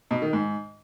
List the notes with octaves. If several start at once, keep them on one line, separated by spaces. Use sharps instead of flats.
B2
D#3
G#2